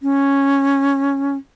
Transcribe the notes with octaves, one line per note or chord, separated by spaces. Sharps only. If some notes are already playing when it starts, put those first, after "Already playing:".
C#4